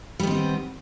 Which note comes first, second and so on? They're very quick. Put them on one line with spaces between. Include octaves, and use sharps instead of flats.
G3 D#3 C4 D#4 B3